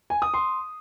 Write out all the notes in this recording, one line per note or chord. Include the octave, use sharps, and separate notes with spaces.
G#5
D#6
C6